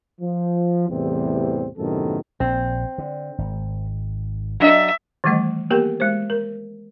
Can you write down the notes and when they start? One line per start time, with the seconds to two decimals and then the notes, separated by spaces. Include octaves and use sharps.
0.21 F3
0.89 E2 A2 C3 E3 G3 C4
1.78 F#2 A2 C3 D#3 B3 A4
2.40 A#1 C4
2.98 D3
3.38 G#1
4.60 F#3 D4 D#5 E5
5.24 D#3 E3 G3 A3 D#5
5.70 A#3 B3 G4 A#4 G5
6.00 G#3 C5
6.30 A#4